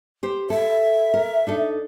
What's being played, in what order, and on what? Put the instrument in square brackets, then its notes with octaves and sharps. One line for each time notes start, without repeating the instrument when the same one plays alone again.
[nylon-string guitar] G4 C5
[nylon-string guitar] A4 [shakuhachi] E5
[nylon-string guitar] A#4
D4 D#4 A4